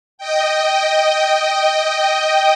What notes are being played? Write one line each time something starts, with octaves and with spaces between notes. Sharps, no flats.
D#5 G5